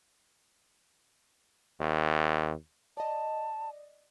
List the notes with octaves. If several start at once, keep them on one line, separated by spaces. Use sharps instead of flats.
D#2
D5 D#5 A5